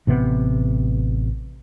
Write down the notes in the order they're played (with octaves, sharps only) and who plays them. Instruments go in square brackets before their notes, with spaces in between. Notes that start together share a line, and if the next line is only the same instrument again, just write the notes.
[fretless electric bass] A1 C3 D#3 B3